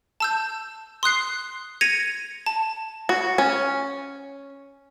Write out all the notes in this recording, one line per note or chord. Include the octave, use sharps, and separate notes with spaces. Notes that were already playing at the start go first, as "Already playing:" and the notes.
A5 E6 G6
C6 D#6 F#6 C7
G#6 A#6 C#7 D#7 F7
A5
F#4
C#4